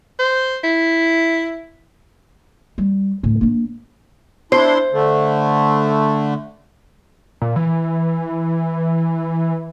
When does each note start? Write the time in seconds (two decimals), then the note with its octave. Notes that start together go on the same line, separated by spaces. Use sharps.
0.19 C5
0.64 E4
2.78 G3
3.23 D2 A2
3.41 A#3 D4
4.52 D4 E4 C5 C6
4.92 D3 A3
7.41 A#2
7.56 E3